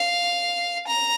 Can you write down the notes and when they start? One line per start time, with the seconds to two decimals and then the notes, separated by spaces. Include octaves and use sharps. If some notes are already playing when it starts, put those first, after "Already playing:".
Already playing: F5
0.87 A#5